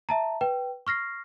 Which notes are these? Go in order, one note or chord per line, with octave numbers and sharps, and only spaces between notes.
E5 A5 A#5
B4 G5
C#6 F6 A#6 C7